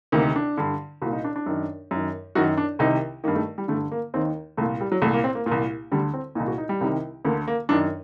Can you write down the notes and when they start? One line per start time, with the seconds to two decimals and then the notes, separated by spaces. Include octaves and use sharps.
0.12 D2 C3 D#3 A#3
0.36 D4
0.57 G2 D3
1.02 C2 F#4
1.06 A#2
1.13 D#4
1.24 D4
1.36 D4
1.46 F#2 D#3
1.91 F#2 D#3
2.35 F#2 D#3 F#4
2.58 D4
2.79 C2 C3 D#3 D#4
3.24 D#3 A#3
3.28 G2
3.35 A3
3.58 G3
3.68 G2 D3 A3
3.91 A#3
4.14 D#2 C4
4.17 D#3
4.57 C2 A#2 A3
4.81 G3
4.92 F#3
5.02 C2 A3
5.06 A#2
5.13 A#3
5.24 C4
5.35 A#3
5.46 A#2 A#3
5.51 C2
5.92 D2 D3 G3
6.14 C4
6.35 A#2 D#4
6.40 C2
6.47 F#4
6.58 D#4
6.69 G3
6.81 C2 C3 D#3
7.25 D2 D3 A#3
7.48 A#3
7.69 F#2 D#3 D4